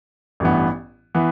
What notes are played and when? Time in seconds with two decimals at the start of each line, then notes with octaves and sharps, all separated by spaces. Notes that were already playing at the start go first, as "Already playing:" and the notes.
0.40 A1 G2 E3 B3
1.15 E3 B3